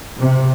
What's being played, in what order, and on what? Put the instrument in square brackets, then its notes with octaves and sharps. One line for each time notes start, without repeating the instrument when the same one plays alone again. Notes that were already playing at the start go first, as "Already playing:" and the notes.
[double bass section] C3